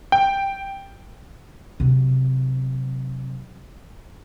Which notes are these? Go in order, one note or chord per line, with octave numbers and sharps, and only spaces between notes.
G5
C3 F#3